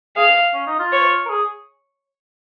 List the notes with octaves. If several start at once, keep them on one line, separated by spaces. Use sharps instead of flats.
G#4 F5
C#4
D#4
F4
C#5
A#4
G#4